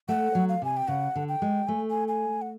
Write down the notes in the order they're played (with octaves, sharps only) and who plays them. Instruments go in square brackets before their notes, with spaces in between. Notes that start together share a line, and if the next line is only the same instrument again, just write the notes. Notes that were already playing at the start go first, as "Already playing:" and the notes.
[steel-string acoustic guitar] A3 [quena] F#5
[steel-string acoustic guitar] F#3
[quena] F5
[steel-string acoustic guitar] C3 [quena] G#5
[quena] G5
[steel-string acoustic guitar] C#3 [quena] F#5
[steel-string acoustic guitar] D3
[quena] G5
[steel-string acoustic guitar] G#3
[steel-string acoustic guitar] A3 [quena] G#5
[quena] G#5
G#5
F#5